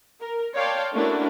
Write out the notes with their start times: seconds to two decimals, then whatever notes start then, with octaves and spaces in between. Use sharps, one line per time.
0.21 A#4
0.55 C#5 D5 F5 G5 A5 C6
0.93 A3 A#3 C#4 D4 E4 F#4